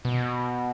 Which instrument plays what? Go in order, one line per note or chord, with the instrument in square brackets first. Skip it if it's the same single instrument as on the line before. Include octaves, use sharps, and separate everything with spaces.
[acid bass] B2